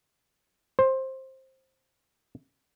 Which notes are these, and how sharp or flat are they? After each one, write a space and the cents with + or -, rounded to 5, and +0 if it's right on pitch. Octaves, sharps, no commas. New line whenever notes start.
C5 +15